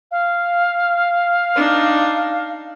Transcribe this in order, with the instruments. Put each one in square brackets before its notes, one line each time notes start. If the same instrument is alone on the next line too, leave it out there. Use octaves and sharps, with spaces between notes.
[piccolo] F5
[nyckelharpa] D4 D#4